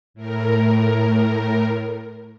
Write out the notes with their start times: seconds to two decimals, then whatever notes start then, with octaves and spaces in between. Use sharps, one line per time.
0.14 A2 A#4